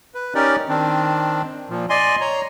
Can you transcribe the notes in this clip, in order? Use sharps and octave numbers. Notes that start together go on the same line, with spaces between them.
B4
C#4 D#4 G4 A#4 D5
D#3 C4 D4
A#2 F3
D5 D#5 G#5 C6
C#5 A#5